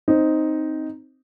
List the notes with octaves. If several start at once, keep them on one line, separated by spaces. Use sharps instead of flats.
C4 D#4